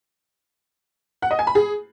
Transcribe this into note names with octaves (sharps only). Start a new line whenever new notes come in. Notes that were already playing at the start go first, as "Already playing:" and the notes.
F#5
D#5
G#5
B5
G#4